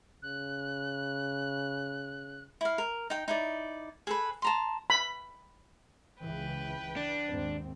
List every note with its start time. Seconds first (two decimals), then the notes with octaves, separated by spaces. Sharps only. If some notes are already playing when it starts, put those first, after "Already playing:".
0.22 C#3 F#6
2.61 E4 F5
2.78 A#4
3.10 D#4 G5
3.28 D#4 E4 D5
4.07 G#4 A4 B4
4.42 A5 A#5 C6
4.90 B5
6.22 C#2 C#3 E3 B4 G5
6.97 D4
7.28 D#2 G#2 C4